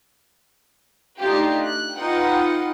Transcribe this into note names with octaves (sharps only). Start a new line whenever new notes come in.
A3 D4 D#4 F4 G4
F#6
D#4 F4 B4 F#5 G5